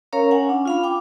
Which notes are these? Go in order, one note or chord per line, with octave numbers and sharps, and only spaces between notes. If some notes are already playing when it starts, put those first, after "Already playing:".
C#4 A#4 C#5 F5 A#5
C#4 F#5 G#5
C#4 D4
F4 F5 B5
G5 D6